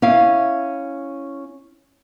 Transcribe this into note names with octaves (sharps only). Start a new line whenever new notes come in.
C#4 E4 F5